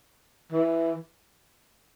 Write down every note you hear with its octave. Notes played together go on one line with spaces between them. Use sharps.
E3